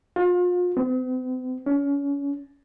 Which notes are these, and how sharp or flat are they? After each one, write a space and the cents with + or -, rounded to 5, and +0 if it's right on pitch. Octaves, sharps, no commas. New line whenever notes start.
F4 +35
C4 -45
C#4 +30